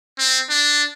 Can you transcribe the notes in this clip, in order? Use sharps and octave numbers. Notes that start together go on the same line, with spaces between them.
C4
D4